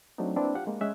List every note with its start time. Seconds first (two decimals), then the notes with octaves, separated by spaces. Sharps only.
0.18 F#3 A3 C4 D4 D#4
0.36 A#3 C4 D4 E4 B4
0.55 F4 G4 F5 F#5
0.67 G#3 A#3
0.81 G#3 C#4 G#4 E5 F#6